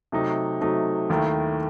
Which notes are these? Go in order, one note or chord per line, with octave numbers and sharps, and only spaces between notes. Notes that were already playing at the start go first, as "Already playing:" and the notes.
C3 F#3 A3 D#4
C3 F#3 A3 D#4
D#2 D#3 A3 E4